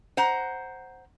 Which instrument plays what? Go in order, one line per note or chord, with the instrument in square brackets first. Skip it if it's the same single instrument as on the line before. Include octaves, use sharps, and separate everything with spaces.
[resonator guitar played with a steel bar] C5 F#5 A#5